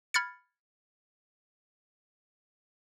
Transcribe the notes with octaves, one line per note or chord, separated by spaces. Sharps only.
B5 F6 G#6 A6 C#7